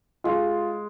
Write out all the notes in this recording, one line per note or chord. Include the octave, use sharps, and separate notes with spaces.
G#3 F4